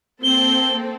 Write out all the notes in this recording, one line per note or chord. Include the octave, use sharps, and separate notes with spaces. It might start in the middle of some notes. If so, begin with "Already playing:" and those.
A#3 C4 A4 G7